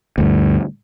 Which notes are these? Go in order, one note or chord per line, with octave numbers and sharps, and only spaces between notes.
D2 G2